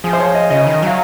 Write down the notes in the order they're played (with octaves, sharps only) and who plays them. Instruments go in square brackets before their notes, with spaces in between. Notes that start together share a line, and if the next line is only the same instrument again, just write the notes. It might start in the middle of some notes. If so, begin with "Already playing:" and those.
[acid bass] F3 [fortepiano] G#4
[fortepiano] C5
C#5
D#5
[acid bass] C#3 [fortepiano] D#5
[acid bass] D#3
[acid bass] F#3 [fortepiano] F5